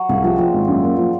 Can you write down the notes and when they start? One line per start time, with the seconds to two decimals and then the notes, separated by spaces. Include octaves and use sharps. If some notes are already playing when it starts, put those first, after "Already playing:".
Already playing: F#3
0.09 C2 C#3
0.24 C3 F3
0.38 A#2 F3
0.53 G#1
0.68 F#2
0.83 A#3
0.98 F3